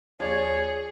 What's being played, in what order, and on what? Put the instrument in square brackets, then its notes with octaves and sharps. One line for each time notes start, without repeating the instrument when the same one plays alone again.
[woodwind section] D#2 C#5 [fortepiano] F3 D5 [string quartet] G#4